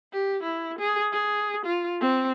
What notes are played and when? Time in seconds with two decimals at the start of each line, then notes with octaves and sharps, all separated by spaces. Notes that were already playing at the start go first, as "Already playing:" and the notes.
0.13 G4
0.43 E4
0.79 G#4
1.13 G#4
1.65 F4
2.01 C4